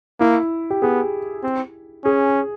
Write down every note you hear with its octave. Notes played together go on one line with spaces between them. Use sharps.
A#3 E4
G4
B3 G#4
C4
C#4 G#4